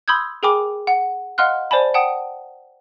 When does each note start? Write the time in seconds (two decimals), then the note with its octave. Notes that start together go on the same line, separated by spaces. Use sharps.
0.08 B5 C6 D#6 E6 G6 G#6
0.43 G#4 A#4 G5 G#5 B5 D6
0.87 F#5
1.38 D#5 F5 F#5 C6 F6 F#6
1.71 C5 D5 G#5 A5 B5
1.94 F#5 G5 A5 D#6